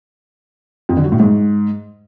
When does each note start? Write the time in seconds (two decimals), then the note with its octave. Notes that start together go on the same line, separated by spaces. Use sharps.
0.89 F2
0.97 D3
1.04 F#3
1.12 A2
1.20 G#2